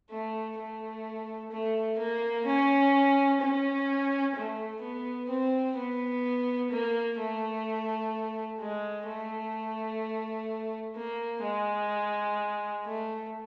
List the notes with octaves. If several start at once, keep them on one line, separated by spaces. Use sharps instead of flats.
A3
A3
A3
A#3
C#4
C#4
A3
B3
C4
B3
A#3
A3
G#3
A3
A#3
G#3
A3